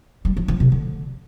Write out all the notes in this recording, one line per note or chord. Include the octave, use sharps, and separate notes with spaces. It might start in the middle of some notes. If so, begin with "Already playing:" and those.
G3
F3
F3
C3
D3